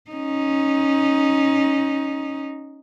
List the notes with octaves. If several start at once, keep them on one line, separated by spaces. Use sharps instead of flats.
C#4 D#4